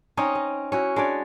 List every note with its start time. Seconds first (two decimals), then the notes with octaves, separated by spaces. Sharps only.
0.17 C4 C#4 D#4
0.35 D#5
0.72 C#4 E4 F#4
0.96 G#3 D4 C#5 D5